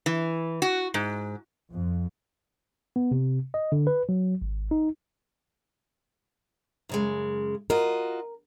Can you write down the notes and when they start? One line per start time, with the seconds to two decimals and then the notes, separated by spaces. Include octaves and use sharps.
0.06 E3
0.62 F#4
0.94 G#2
1.71 F2
2.96 B3
3.11 C3
3.54 D#5
3.72 D3
3.87 B4
4.09 F#3
4.42 G#1
4.71 D#4
6.89 F#2 C#3 G#3
7.70 F4 F#4 A#4 D#5